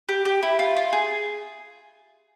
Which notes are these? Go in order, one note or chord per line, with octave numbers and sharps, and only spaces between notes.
G4
G4
E4
F4
F4
G#4